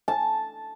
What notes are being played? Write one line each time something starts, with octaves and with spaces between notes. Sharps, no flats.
A5